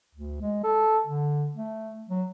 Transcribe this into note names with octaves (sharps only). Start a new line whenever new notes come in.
D2
G#3
A4
D3
A3
F#3